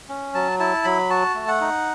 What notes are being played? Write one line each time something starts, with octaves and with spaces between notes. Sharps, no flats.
C#4
F#3 A5
E4 A5
F#3 B5
F#4 A5
A3
F#5
D#4